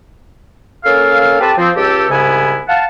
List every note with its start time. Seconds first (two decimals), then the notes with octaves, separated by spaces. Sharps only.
0.84 A#3 C#4 A4 F5
1.40 C4 G4 A4 B4 A5
1.57 F3 C4
1.75 C#2 G4 A4
2.09 C2 G#2 C#3 B3 E4 G#5
2.67 F5 F#5 A5